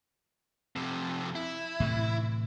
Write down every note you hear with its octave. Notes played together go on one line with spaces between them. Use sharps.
F2 C3
E4
A2 C3 E3